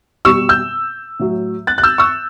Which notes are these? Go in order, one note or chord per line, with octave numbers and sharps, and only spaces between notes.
B2 G3 C#6 E6
E6 G6
A2 F#3
F#6 A6
F#6
E6 G6
C#6 E6